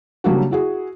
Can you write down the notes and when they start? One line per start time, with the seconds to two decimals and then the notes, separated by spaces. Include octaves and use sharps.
0.24 C#3 F#3 G3 A#3 D4 F#4
0.51 E4 F#4 G#4